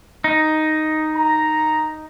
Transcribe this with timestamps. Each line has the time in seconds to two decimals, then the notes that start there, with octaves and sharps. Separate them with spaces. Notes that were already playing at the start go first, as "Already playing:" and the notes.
0.24 D#4
1.15 A#5